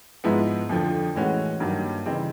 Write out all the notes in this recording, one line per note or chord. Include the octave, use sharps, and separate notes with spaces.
G#2 F3 G#3 B3 E4
F2 D3 F3
A2 E3 G#3 C#4 F#4
G2 D#3 F#3 A#3
C#3 E3 G3 C4 D#4